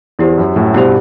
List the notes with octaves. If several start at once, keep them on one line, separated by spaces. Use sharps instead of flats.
E2 E4 G4 C5
F#2
F#2 A2
G2 B2 E4 G4 C5